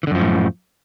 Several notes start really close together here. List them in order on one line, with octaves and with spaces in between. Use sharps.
E3 D3 F#2 F3 A2